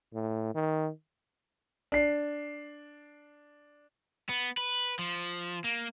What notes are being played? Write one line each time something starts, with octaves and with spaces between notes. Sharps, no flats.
A2
D#3
D4 C7
B3
B4
F3
A#3